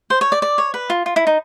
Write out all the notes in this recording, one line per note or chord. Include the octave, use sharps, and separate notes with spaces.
C5
C#5
D5
D5
C#5
B4
F4
F4
E4
D#4